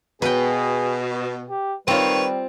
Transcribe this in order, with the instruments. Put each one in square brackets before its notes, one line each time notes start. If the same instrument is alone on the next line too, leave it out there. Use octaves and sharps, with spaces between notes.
[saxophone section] B2 [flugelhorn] G#4 [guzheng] B4 G5
[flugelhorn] G4
[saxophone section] D#3 B4 C#5 [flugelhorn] G3 [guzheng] C4 F4